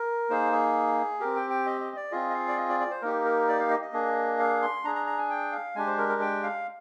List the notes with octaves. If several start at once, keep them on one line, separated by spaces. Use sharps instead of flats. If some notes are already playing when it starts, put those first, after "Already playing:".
Already playing: A#4
A#3 D#4 G#4 C5
G#4
C4 G4 A#4
G5
G5
D#5
D#5
D5
C4 F4 G#4 D#5
D#5
F5
D5
D#5
D5
D5
C5
A#3 D#4 G4 A#4
A#4
D5
F5
D#5
D#5
A#3 D4 G#4
F5
C6
D4 G#4 A#5
A#5
A#5
G#5
G5
F5
G#3 D4 G4 G#5
C5
A#4
A#4
G5
F5